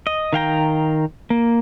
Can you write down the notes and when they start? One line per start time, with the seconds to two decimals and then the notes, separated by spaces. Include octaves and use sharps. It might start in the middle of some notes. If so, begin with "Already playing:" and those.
0.07 D#5
0.33 D#3 F5 G5 A#5
1.30 A#3